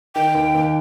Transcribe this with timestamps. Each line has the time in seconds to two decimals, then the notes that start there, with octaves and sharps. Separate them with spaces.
0.15 D#3 G5
0.35 D#2
0.54 D#2